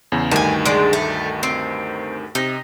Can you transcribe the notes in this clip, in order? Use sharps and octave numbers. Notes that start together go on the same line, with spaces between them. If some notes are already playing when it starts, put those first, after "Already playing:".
E2 C#3
D2 G2 D#3 G#5 A5
G#3 D4
A3
C4
C3 D#4 A#6